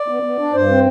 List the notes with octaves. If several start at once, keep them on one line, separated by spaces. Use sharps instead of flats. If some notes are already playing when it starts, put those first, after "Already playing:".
Already playing: D5
B3
B3
D4
G2 C5
C4